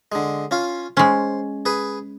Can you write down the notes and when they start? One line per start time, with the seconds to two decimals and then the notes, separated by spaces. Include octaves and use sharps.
0.12 D3 G#3
0.51 C#4 F4 F5
0.97 G#3 C#4 C5
1.65 G#4 B4